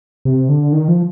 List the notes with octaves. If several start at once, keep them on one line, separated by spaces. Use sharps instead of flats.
C3
D3
D#3
F3